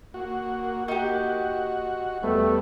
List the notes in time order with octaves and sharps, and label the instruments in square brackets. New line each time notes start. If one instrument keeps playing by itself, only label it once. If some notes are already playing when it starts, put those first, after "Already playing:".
[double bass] A#3 [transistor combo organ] F#4
[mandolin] D#4 G4 [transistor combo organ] F#4
[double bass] E2 [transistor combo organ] G3 B3 [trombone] A3